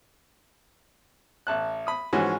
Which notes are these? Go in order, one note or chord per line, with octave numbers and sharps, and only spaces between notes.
A1 A5 F#6
B5 D#6
G#2 E3 F3 G#3 C#4 F#4